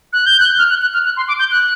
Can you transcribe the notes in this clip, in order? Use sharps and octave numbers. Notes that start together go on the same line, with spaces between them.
F#6
G6
F#6
F6
F#6
F#6
F6
F#6
C6
D6
G6
F#6